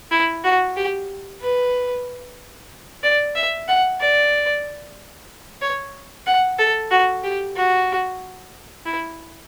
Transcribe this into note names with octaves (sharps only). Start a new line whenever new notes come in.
E4
F#4
G4
B4
D5
E5
F#5
D5
C#5
F#5
A4
F#4
G4
F#4
E4